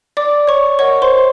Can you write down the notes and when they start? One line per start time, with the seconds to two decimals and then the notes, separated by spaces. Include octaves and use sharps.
0.17 D5 D6
0.48 C#5 C#6
0.79 A#4 C#5 D#5 F#5 C#6
1.02 C5 C6